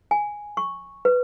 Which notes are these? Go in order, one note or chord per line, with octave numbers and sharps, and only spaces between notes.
G#5
C#6
B4